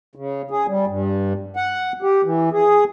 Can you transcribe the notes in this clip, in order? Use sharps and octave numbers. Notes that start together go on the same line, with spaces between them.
C#3
G#4
G3
G2
F#5
G4
E3
G#4